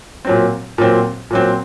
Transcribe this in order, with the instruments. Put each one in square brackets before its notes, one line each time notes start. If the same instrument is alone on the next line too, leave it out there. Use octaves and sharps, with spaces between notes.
[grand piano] A#2 F#3 C4
A#2 F#3 C4
A#2 F#3 C4